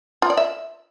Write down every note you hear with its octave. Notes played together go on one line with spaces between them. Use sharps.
F4
D5
E5